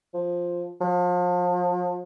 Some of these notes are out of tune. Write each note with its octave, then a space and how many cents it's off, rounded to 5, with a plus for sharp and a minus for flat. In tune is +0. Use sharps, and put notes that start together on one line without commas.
F3 +5
F3 +35